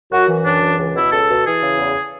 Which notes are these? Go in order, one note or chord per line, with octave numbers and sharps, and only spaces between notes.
F#2 F#4
E3
F#2 D4
E3
C#2
B2 E4
C#2 A4
B2
E3 G#4
C#3
E2